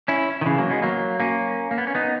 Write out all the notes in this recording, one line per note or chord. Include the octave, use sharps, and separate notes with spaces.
C#4 E4
D#3
C#3 E3
F#3 A#3
G#3 B3
F#3 A#3
A#3 C#4
A#3
B3
C#4
B3 D#4